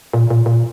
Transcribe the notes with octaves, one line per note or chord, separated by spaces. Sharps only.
A#2
A#2
A#2